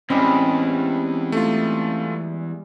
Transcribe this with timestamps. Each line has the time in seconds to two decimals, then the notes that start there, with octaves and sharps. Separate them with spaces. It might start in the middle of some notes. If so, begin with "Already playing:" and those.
0.10 A1 E2 G3 G#3 C4 C#4 G4
1.32 A3 F4